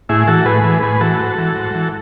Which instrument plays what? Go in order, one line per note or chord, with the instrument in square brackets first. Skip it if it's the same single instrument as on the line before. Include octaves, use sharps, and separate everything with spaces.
[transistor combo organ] A2 E4 G#4
E3 F#4 A4
A2 G#4 B4
E3
A2 G#4 B4
E3 F#4 A4
G#2
E3
G#2
E3